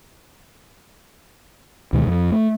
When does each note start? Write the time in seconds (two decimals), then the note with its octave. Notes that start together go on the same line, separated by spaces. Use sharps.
1.93 D2 B2 D#3 G#3
2.07 F2 F3
2.31 A3